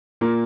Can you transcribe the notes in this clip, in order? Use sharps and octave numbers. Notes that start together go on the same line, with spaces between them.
A#2 A#3